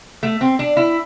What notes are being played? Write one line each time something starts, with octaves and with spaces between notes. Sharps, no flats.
A3
C4
D4
E4